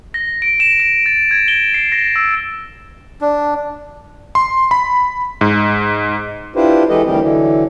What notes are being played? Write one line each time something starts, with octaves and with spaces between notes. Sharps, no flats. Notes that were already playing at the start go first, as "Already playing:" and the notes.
A#6
D7
E7
D7
A6
G#6
G7
C7
A#6
E6
D4
C6
B5
G#2
D4 E4 F4 G4 B4 C5
E3 G#3 G4 A4 B4 D#5
D2 D#3 E3 G3 C4 G4
D3 E3 F#3